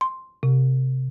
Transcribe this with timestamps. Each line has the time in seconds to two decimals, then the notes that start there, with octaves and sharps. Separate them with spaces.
0.01 C6
0.43 C3